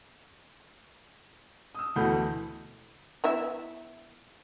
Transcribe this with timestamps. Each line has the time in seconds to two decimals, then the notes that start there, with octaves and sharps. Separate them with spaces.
1.75 D#6 E6
1.96 D2 B2 E3 A3 B5 G6
3.24 B3 E4 E5